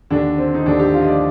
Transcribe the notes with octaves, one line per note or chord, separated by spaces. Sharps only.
D#2 D3 D4
C4
D#4
D#2 D3 D4
G4
F4
D#5
D5